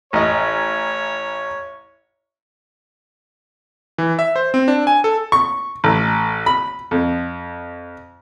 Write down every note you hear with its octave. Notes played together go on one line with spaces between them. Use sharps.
A1 C#5 D#5
E3
E5
C5
C4
D4
G#5
A4
C#6
A1
B5
F2